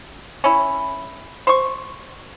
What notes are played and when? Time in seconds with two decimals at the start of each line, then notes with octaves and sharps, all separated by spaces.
0.44 C#4 E4
1.47 C5 C#6